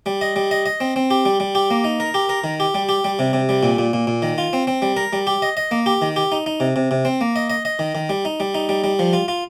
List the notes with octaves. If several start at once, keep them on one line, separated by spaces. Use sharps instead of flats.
G3
D#5
G3
D#5
D#5
C4
C4
G4
G3
G3
G4
A#3
D#4
A#4
G4
A#4
D#3
G4
G3
G4
G3
C3
C3
G3
A#2
A#2
A#2
A#2
D#3
F4
C4
C4
G3
A#4
G3
G4
D#5
D#5
A#3
G4
D#3
G4
D#4
D#4
C3
C3
C3
C4
A#3
D#5
D#5
D#5
D#3
D#3
G3
D#4
G3
D#4
G3
G3
F3
F4
F4